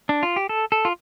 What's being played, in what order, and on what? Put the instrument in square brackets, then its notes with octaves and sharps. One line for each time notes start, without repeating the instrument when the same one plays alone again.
[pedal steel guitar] D4
F4
G4
A4
A4
F4